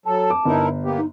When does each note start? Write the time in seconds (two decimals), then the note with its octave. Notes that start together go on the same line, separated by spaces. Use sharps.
0.06 F#3 A4 A5
0.30 D6
0.45 G1 D#4 E4 A#4
0.83 A#3 B3 G4
0.97 D#4